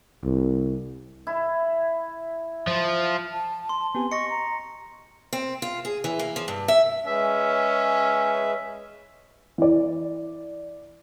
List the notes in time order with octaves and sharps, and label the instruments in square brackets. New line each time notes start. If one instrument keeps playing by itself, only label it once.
[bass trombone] C2
[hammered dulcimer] E4
[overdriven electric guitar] F3
[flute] A5
[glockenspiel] C6
[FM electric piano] B3 C4 G4 [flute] G#5
[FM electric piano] D#5 [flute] C#6 [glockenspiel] A#6 C#7
[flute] A#5
[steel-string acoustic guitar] C4
F4
G#4
E3
A#3
F3
G2
E5
[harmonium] G#3 G#4 B4 [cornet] C#4 [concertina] E5
[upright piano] E3 D5